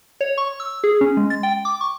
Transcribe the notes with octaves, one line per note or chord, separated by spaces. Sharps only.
C#5
C#6
E6
G#4
C#4
G#3
A6
G5
D6
C#6